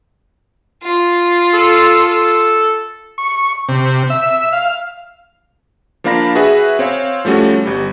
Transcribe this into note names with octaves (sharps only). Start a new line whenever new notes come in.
F4
A4
A4
C#6
C3
E5
F5
F3 A#3 D4 F5 B5 A#6
F#4 G#4 B4 E5
C4 C#5 F5
F3 G3 A3 C#4 F#4
G1 G3